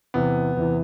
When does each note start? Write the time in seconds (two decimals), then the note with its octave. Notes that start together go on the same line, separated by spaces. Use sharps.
0.14 E2 C3 E3 B3
0.57 E2 C3 E3